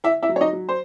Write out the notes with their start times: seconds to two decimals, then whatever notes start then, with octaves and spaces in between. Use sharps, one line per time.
0.04 E4 E5
0.23 E4 E5
0.29 F#3
0.36 C#5
0.41 D#4 D#5
0.53 F#3
0.69 C5